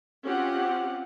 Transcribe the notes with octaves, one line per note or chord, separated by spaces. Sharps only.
C4 C#4 F4 G4 F#5